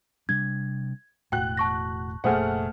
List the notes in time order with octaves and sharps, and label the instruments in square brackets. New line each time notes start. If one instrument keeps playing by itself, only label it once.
[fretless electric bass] C3 G3 D4 [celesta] G#6
[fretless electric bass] E1 A2 [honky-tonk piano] F#4 F#6 [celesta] G5
[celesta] A5 C#6 A#6
[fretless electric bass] F1 A#2 [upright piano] A3 G#4 C5 [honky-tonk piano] F#5 F6